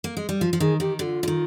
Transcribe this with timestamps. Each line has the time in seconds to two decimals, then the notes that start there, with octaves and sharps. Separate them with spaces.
0.04 A#3
0.17 G#3
0.29 G3
0.41 F3 F4
0.53 F3
0.60 D#3 G#4
0.80 D#3 G4
0.99 D3 F4 G4
1.23 D3
1.28 D#3